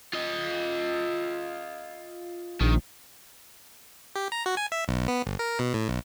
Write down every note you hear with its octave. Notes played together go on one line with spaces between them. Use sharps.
F4 D#5
A#1 D#3
G4
A#5
F#4
G#5
E5
B1
B3
G1
A#4
B2
A2
B1